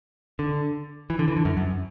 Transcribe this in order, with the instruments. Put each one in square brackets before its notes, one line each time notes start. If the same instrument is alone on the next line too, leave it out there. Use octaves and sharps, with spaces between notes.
[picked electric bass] D3
E3
D3
E3
D3
F#2
F#2